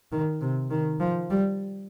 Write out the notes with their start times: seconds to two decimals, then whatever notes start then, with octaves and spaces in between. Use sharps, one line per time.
0.12 D#3
0.41 C3
0.71 D#3
1.00 F3
1.30 G3